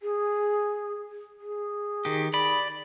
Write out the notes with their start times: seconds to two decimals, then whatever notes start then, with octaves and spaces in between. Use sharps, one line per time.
0.01 G#4
1.40 G#4
2.05 D#3 G4
2.34 D5 B5